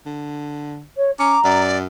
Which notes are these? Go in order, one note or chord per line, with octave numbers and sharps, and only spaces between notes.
D3
C#5
C#4 A#5 D6
F#2 D5